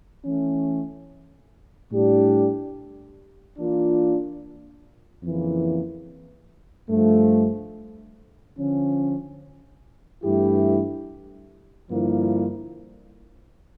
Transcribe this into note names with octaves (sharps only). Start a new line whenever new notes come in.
E3 A3 C#4
A2 G3 D4 G4
E3 A#3 D4 F4
F2 C#3 E3 A#3
G2 F3 A3
D3 F3 C#4
G2 E3 A3 E4 G4
G2 D3 F3 A#3 E4